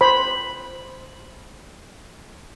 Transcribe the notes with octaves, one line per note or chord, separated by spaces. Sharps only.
C5 B5